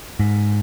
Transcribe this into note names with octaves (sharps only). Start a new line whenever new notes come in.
G#2